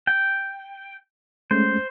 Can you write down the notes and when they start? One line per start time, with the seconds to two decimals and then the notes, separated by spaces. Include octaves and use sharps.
0.07 G5
1.51 G#3 A3 C#4 C5